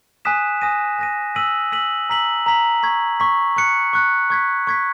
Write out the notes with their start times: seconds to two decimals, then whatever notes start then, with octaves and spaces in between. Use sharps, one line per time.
0.25 G#5 D#6 F#6 B6 E7
0.61 G#5 D#6 A#6 D#7
0.99 G#5 D#6 A#6 D#7
1.35 E6 B6 D#7 F#7
1.72 E6 B6 D#7 F#7
2.09 A#5 E6 B6 F#7
2.46 A#5 E6 B6 F#7
2.83 C#6 G#6 B6
3.20 C#6 G#6 B6
3.56 C#6 F#6 C#7
3.93 C#6 F#6 C#7
4.30 C#6 G#6 B6
4.67 C#6 G#6 B6